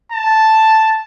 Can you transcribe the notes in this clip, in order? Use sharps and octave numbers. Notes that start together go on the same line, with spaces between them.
A5